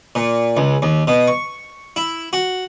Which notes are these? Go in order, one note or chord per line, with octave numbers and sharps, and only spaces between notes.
A#2
C#2
D#2
B2
C#6
E4
F#4